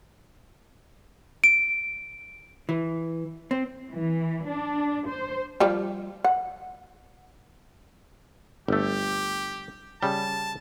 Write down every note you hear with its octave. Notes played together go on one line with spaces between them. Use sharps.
D7
E3
C4
E3
D4
C5
F3 G3 G4
F#5
G1 A3 G4
C#3 G3 A5